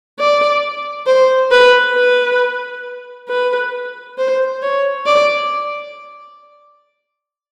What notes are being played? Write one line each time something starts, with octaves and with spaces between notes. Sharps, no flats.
D5
C5
B4
B4
B4
C5
C#5
D5